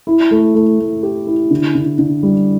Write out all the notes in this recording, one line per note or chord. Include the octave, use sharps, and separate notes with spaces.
E4
A3
A3
A3
G4
E4
D3
D3
D3
G3